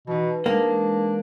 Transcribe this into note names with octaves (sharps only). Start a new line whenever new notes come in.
B2 E3 D#4
G#3 A#3 D4 G#4